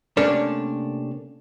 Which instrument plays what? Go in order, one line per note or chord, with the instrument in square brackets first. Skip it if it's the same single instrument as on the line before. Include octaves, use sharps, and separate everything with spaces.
[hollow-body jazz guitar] C3 A3 A#3 C#4 D4